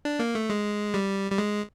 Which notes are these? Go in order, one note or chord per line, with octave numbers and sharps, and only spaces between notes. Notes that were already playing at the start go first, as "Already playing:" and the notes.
D4
A#3
A3
G#3
G3
G3
G#3